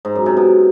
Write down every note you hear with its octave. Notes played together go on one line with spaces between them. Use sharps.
G#2
F#2
C3
B2